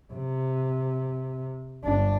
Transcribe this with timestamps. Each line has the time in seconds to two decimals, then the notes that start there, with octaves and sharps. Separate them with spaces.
0.13 C3
1.84 G1 D4